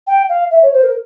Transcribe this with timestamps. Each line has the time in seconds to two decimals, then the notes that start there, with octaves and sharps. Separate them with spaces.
0.07 G5
0.29 F5
0.51 E5
0.62 C#5
0.73 C5
0.83 A#4